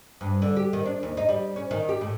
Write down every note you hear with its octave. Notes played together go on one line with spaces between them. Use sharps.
G2
D3
G4
D#3
D4
D#2
D#4
G3
C#4
D#3
G4
A2